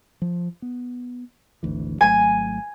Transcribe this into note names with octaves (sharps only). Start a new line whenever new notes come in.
F3
B3
G#1 D2 E3
G#1 F#3 A3 G#5